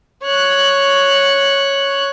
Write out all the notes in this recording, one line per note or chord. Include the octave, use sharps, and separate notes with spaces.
C#5 F#6